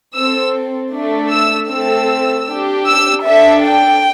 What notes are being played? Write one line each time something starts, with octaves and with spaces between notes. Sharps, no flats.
C4 A4 E6
A3 D4 A4
E6
A3 C4 A4 E6
D4 G4
E6
D4 A4 E5
G5